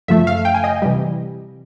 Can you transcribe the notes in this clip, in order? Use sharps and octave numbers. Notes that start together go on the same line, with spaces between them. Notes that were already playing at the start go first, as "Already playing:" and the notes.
F#2 C#3 F3 A3 E5
F5
G5
G#5
D#5
C3 E3 G3